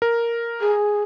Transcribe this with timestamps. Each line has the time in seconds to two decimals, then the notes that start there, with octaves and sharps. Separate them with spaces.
0.02 A#4
0.61 G#4